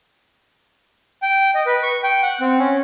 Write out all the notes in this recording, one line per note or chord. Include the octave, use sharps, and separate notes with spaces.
G5
D#5
B4
C#6
G5
F#5
C4
C#4